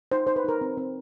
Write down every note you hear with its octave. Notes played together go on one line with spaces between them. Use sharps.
D#4 C5
D#4 C5
B4
D#4 A#4
C4
C4